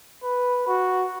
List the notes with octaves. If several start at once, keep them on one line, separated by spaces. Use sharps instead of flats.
B4
F#4